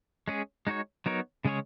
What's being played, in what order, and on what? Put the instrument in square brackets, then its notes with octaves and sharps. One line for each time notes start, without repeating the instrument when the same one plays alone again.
[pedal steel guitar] G#3 C#4 G#4
G#3 D#4 F#4 C#5
F#3 B3 D#4 A#4 C#5
C#3 G#3 C#4 G#4 C#5